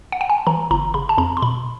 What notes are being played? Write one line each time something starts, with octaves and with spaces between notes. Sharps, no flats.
F#5
G5
G#5
A5
E3 A#5
G1 A#5
C#3 B5
A5
F2 A#5
C6
B2 B5